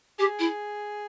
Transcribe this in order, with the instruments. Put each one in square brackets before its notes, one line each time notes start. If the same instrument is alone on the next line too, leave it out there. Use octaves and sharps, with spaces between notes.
[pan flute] G4 [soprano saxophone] G#4
[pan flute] E4